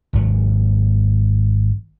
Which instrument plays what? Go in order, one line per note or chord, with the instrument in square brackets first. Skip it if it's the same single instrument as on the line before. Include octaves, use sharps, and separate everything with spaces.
[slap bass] G#1 F#3